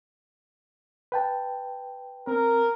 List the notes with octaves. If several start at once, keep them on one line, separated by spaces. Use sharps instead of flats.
B4 G5 A5
C4 A#4